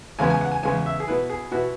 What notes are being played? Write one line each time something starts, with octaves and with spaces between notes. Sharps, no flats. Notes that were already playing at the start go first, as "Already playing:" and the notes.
E2 C#3 G#3 B3 G#5
G#5
F#5
G#5
E2 C#3 G#3 B3 G#5
E5
G#4
B2 B3 E4 B4
G#4
B2 B3 E4 F#4